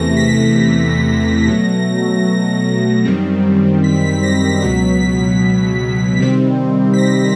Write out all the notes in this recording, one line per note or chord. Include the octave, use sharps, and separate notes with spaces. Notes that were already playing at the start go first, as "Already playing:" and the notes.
Already playing: E2 C3 E3 A3 A#6
B6
B6
A#6
A#6
B2 F#3 A3
F#2 D#3 G3 C4
B6
A#6
C#2 B2 F#3 B6
C3 D#3 G3 C4
B6
A#6